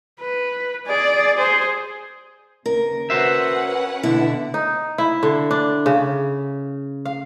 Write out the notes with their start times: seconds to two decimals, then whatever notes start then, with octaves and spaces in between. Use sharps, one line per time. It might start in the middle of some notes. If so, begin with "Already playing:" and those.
0.20 B4
0.86 G#4 D5
1.37 G#4 C5
2.66 D#2 C#3 A#4
3.10 C#4 F#4 B4 C5 E5 F#5
4.03 B2 D3 E4
4.54 D#4
4.98 E4
5.23 D3
5.51 D4
5.86 C#3
7.05 F5